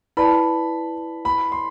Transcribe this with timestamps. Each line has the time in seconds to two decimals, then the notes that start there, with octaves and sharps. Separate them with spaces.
0.17 E4 B4 D5 A5 B5
1.25 B5
1.52 C6